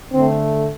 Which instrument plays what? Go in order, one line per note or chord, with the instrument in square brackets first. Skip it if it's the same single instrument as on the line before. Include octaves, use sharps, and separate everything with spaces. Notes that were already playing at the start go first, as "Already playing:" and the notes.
[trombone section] D3 A3 C4